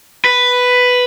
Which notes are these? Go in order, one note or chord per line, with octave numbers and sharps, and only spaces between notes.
B4